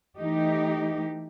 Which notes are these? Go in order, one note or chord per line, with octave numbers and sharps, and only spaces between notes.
E3 A3 D#4 G4